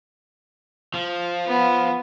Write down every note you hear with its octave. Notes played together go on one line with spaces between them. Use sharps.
F3
B3